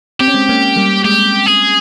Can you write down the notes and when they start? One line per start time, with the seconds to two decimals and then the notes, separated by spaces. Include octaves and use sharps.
0.20 C4 G4
0.28 C#4
0.34 G#3 C4
0.49 A#3 C#4
0.76 G3 A#3
1.04 G#3 G4
1.46 G#4